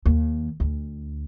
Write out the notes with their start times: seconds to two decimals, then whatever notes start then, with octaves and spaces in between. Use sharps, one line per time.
0.06 D#2
0.60 D2